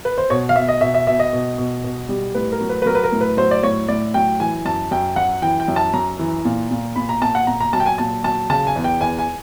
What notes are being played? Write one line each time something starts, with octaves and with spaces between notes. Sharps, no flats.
B4
C5
B2 C#5
F5
B2 E5
D#5
B2 E5
E5
B2 E5
D#5
B2
B2
B2
G3
A2 B4
A#4
F#3
B4
B4
F#3 A#4
B4
A#4
A2
B4
F#3 C5
D5
A2 C#5
A2 D5
F#3 G5
E3 G#5
F#2 A5
F#2 G5
F#2 F#5
E3 G5
G5
F#2
A5
F#2 A#5
E3
A#2
A#2
A#2 B5
A#5
A#2 A5
F#5
A#2 A#5
A#5
F#3 A5
G5
G#5
A#2 A5
F#3 A5
C#3 A5
G#5
E2
G5
E2 G#5
G#5